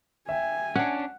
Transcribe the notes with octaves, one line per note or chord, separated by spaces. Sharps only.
E5 G5 G#5
C#4 D4 F#5